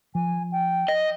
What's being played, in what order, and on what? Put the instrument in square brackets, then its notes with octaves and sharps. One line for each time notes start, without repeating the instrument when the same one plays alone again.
[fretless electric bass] F3 [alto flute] G#5
[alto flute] G5
[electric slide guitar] D#5